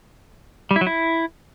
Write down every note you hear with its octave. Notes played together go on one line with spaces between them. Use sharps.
G3
E4
F#3
E4